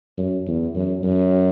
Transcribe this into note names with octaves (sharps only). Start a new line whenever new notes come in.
F#2
E2
F#2
F#2